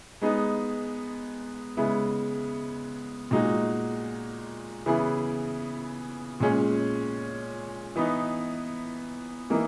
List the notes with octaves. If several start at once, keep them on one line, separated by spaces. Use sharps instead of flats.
G#3 B3 D#4 G#4
C#3 G#3 B3 E4
A#2 G#3 D#4 F#4
C#3 E3 B3 E4 G#4
A#2 G#3 C#4 G#4 C#5
E3 B3 D#4
E3 A#3 D#4